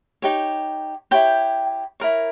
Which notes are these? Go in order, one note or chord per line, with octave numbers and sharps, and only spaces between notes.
D#4 G4 C#5
E4 G4 C#5 G5
E4 A#4 C#5